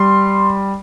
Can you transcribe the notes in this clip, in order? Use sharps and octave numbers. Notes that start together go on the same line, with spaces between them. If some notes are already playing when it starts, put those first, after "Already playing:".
Already playing: G3 C6